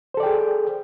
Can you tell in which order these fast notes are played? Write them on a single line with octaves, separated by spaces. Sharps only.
C5 A4 D5 G5 G#4